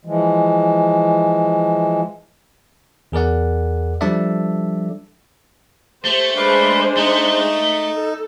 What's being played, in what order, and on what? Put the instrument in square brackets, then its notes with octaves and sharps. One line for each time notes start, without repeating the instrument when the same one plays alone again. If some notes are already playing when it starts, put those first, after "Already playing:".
[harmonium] E3 F3 G#3
[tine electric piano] E2 G#4 A#4 D5 F#5
F3 G3 D4 A4 D5 E5
[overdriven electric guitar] A3 [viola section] G4 C5
[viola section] G#3 D4 C5 [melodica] B4 D5 F5
[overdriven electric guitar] A3 [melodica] D#4
[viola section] A4